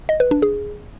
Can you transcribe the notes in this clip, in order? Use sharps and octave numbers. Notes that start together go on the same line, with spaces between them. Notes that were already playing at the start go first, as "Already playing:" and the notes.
D#5
B4
D4
G#4